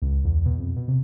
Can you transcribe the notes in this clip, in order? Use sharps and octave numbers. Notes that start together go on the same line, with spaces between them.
C#2
E2
B2
F2
B2
C3